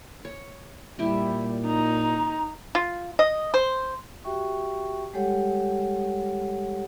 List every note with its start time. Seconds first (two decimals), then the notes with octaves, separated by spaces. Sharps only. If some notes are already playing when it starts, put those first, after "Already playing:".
0.25 C#5
0.99 A#2 G3 E4 G4
1.66 D#4 A#5
2.75 F4
3.19 D#5
3.54 C5
4.24 F#4 G4 E5 G5 C#6
5.13 G3 G#3 G4 A4 C#5 F#5